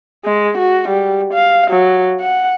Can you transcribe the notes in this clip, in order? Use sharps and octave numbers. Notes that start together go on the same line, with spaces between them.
G#3
F#4
G3
F5
F#3
F#5